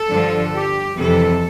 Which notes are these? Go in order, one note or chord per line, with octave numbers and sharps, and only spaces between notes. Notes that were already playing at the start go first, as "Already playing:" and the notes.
Already playing: A4
G2 D3 F3
G4
F2 C3 E3 A4